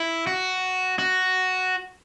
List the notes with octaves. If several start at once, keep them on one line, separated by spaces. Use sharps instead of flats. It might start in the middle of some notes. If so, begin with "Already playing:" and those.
Already playing: E4
F#4
F#4